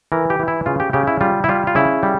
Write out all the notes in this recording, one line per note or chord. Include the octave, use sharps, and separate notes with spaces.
E3 A#4
G4
E3
E4
C#3 F4
G4
C#3 G4
E4
G3 F4
E4
G3 F4
F4
C#3 E4
G3